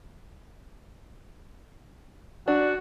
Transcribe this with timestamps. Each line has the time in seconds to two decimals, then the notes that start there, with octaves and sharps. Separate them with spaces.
2.48 D4 F#4